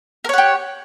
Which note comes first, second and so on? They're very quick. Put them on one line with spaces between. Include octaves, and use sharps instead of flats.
A#4 C#5 F#5 G4